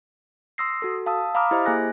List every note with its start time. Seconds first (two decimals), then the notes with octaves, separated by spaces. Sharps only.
0.58 C6 D#6 E6 A#6 C7
0.82 F#4 A4
1.06 F5 A5 D#6 E6
1.35 F5 A#5 B5 D6 D#6 F6
1.51 E4 G4 C5 D#5
1.66 A#3 G#4 G#5 F#6 A#6